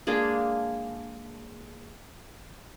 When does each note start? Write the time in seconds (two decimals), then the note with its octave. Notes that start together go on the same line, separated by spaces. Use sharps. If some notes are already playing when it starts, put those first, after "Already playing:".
0.07 G#3 A#3 D4 G#4